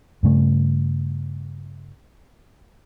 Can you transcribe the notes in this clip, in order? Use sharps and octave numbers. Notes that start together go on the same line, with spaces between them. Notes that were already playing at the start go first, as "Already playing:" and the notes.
G2 C#3 A3